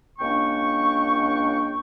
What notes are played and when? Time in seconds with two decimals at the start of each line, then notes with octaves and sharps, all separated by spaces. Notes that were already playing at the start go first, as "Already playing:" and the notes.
0.19 C#2 A#3 D4 G5 C#6